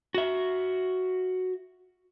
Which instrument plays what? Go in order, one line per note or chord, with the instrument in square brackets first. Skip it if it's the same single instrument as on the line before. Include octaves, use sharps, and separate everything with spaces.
[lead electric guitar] F#4 E5